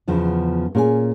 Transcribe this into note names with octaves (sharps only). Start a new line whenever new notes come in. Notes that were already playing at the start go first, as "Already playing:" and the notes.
E2 C#3 F3 B3
A#2 C#4 G#4 C#5 G#5